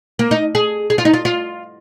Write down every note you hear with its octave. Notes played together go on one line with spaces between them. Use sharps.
A#3
D#4
G#4
G#4
F4
D#4
F4
F4